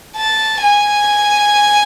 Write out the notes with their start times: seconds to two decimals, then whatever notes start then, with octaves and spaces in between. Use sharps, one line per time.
0.17 A5
0.62 G#5